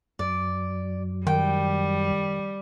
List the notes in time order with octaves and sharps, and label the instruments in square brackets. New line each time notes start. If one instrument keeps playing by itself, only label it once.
[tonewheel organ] F#2 [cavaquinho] D5
[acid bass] D#3 [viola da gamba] G3 [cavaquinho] G5